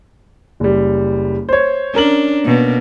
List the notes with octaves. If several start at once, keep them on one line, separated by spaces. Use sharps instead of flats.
F#1 G3
C5 C#5
C#4 D4 A#4 F#7
B2 A#3